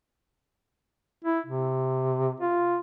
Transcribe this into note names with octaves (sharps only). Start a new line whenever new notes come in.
E4
C3
F4